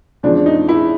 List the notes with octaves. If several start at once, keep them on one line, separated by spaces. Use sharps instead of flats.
E2 C#3 F3 G#3 D4
D#4
E4